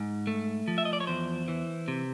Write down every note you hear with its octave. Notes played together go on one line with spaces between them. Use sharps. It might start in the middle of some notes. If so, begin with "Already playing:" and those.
Already playing: G#2
A3
F3
E5
D#5
D5
C#5
E2 C5
E3
C3